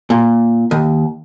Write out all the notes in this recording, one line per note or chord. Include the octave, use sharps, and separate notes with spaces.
A#2
D#2